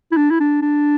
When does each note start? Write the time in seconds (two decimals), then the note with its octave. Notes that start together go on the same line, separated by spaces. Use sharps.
0.12 E4
0.17 D4
0.31 E4
0.40 D4
0.62 D4